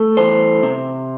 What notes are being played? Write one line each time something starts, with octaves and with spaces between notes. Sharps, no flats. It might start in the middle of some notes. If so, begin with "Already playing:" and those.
Already playing: A3
E3 C5
C3